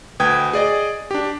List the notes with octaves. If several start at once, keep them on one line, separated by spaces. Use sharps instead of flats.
D2 B4 G5 D#6 G#6
G#4 D5 D#5
D4 G4